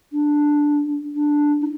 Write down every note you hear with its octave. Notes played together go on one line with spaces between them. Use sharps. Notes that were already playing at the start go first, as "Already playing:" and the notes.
D4
D4
D#4